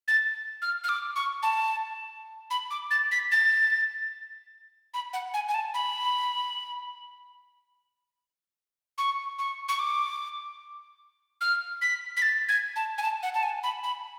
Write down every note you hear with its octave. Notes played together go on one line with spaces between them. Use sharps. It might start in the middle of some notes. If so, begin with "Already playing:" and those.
A6
F6
F6
D6
C#6
A5
B5
D6
A6
B6
A6
B5
F#5
G#5
G#5
A5
B5
C#6
C#6
C#6
D6
F6
B6
B6
A6
G#6
A5
G#5
A5
F#5
A5
G#5
B5
B5